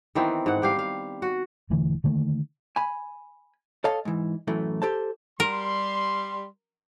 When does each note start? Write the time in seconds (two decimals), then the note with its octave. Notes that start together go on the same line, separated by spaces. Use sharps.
0.15 D#3 E3 B3 C4
0.46 G#2 F#5
0.62 G3 G4 F5
0.79 F5
1.22 F#4
1.70 E1 D3 E3 A3
2.04 D3 D#3 A3 A#3
2.76 G#5 B5
3.84 A4 C#5 D#5 F5 A5
4.05 G#2 E3
4.47 F#2 A2 E3 A3
4.82 G4 A4 C5 A5
5.40 G3 A#4 C6